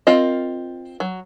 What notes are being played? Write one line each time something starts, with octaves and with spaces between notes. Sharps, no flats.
C4 F4 A#4 D#5
F#3